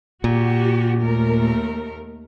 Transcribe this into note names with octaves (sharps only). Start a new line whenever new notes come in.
A#2 F#4 G4
D#2 A3 A#4